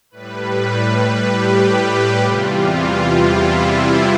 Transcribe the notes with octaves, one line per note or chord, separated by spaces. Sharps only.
A2 G3 B4
G4
E2 C3 E3 G3 F4
F4
E4
F4